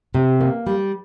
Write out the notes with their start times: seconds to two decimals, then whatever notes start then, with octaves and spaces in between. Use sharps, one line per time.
0.14 C3
0.41 A#3
0.67 G3